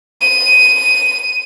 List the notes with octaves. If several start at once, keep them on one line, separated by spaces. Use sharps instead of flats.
D#7